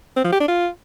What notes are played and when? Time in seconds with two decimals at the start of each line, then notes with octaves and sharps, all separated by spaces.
0.17 C4
0.24 F3
0.32 G4
0.40 D4
0.48 F4